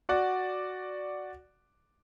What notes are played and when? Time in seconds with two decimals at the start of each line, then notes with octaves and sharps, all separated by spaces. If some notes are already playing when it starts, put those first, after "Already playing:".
0.09 F#4 D5 F#5